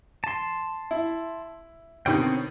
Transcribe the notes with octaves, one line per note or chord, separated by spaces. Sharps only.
A5 C6
E4
B2 D3 D#3 C4 C#5 G5